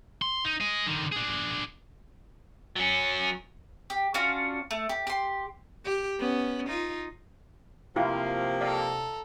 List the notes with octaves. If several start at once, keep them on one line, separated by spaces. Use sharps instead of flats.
C6
D#4
G#4 D#5
D3 D#3
D4 G#4
F#3 C#4
G4
C#4 D4 F4 F#4
A3
G4
G4 C6
G4
B3 C#4
D#4 F4
C3 F3 A#3 C4 E4 F4 G5
A4 D5 D#5 F5 A#5